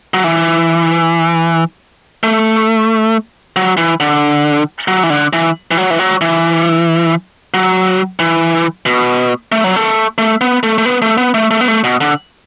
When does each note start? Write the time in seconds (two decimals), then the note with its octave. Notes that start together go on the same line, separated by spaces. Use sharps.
0.14 F#3
0.24 E3
2.23 A3
3.56 F#3
3.77 E3
4.00 D3
4.88 F#3
5.03 E3
5.10 D3
5.33 E3
5.71 E3
5.77 F#3
5.90 E3
5.99 F#3
6.21 E3
7.54 F#3
8.19 E3
8.86 B2
9.52 A3
9.64 F#3
9.76 A3
10.18 A3
10.41 B3
10.63 A3
10.78 A3
10.85 B3
11.02 A3
11.18 B3
11.34 A3
11.51 A3
11.61 B3
11.68 A3
11.84 B2
12.01 D3